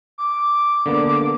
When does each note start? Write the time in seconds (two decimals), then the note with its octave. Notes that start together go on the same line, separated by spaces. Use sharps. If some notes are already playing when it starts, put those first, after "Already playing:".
0.18 D6
0.86 D3 A#3 B3